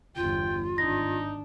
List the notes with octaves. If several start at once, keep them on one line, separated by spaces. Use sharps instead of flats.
G1 E2 F4 G5
G#1 D4 D#4 A#6